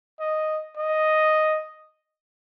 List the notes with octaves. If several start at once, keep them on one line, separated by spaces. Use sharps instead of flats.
D#5
D#5